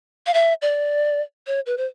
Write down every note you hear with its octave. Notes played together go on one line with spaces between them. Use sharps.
F5
E5
D5
C#5
B4
C5